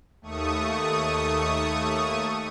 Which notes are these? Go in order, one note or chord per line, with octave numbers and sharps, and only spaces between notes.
D#2 A3 C#6 D#6